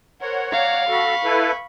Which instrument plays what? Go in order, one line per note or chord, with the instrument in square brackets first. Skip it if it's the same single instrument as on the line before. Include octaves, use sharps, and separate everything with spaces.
[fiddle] A#4 C5 [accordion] C#5 F#5
[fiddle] D5 A#5 [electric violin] F5
[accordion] F#4 A4 [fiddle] B5 C#6
[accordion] E4 A4 B4